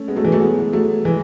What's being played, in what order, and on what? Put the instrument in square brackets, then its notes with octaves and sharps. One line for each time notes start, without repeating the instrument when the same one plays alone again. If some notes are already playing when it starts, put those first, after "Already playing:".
Already playing: [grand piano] A3 C#4
G#3 B3
F#3 A3
E3 G#3
F#3 A3
G#3 B3
F#3 A3
E3 G#3